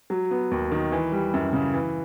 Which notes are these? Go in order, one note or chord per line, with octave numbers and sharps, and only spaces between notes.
F#3
B3
D#2
D#3
E3
G3
F#2
C#3
E3